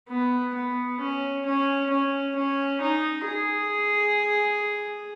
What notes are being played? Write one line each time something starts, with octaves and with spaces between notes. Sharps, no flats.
B3
B3
C#4
C#4
C#4
C#4
D#4
G#4